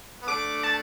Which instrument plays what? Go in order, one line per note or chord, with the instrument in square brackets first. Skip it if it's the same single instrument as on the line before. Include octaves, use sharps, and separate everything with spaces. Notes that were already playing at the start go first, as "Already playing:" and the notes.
[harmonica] B3
[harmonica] A3 D4 [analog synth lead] D6
[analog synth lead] A5